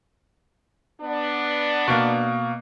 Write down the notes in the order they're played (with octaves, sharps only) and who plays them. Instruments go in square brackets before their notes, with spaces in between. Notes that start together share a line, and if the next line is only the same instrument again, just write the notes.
[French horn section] B3 D4 D5
[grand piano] B2 A#3